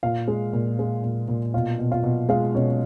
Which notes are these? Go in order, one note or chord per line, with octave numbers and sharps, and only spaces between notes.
A#2 F4 F5
G#3
A#2
G#3
A#2
A#2
B2 F4 F5
B2
F4 F5
B2
G#3 F4 F5
B2 C#4 C#5